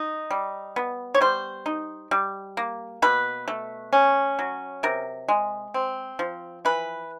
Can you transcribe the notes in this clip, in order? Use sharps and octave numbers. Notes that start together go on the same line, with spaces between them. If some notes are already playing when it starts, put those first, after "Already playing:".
Already playing: D#4
G3
B3
C#5
G3 C5
D#4
G3
A#3
B2 B4
A3
C#4
F#3
C3 A#4
G#3
C4
F3
E3 B4